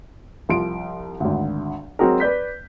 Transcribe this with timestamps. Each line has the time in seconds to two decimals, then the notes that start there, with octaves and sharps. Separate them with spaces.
0.49 C2 F3 C6 D7
1.20 G#1 D2
1.99 F#3 G#3 C4 F#4 G#4 A#4
2.20 B4 D5 G6 B6